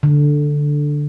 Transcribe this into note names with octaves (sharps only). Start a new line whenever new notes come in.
D3